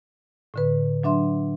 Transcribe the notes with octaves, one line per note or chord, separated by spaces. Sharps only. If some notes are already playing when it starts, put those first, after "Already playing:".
A2 D3 B4
F#3 D4 E5 C6